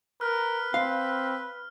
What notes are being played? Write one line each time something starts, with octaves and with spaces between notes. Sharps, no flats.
A#4 B4 F6
C4 F5